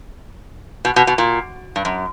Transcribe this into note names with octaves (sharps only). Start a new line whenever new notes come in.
B2
B2
B2
A#2
G2
F#2